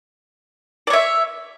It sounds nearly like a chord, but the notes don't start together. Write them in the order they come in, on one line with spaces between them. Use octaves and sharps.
D5 C#5 E5